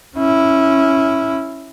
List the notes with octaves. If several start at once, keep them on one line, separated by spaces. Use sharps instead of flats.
C#4 E4